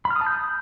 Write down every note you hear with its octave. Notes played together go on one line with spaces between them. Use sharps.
B5
F6
D#6
A5
G6